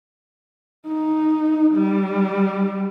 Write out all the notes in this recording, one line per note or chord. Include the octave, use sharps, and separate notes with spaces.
D#4
G3